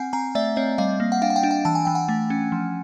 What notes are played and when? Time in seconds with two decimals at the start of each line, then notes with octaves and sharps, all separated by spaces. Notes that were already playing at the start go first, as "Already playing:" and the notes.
Already playing: C4 F#5 G#5
0.13 C4 G#5 A#5
0.35 A3 D5 E5
0.56 C4 C#5 D#5
0.78 G3 D#5 F5
1.00 A#3
1.12 F#5
1.22 D4 F5 G5
1.30 F#5
1.36 F5 G5
1.43 D4
1.51 F5 G5
1.65 E3 A5
1.75 G#5
1.85 E3 G5
1.95 F#5 G#5
2.08 A3
2.30 C#4
2.52 F3